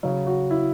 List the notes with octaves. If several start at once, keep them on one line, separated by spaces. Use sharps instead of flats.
C#3 F#3 C#5
F#4
E4